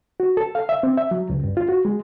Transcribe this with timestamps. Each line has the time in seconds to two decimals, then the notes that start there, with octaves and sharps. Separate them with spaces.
0.20 F#4
0.37 A4
0.55 F5
0.69 E5
0.83 C4
0.98 E5
1.11 F#3
1.30 C#2
1.44 G2
1.57 F4
1.69 F#4
1.85 G#3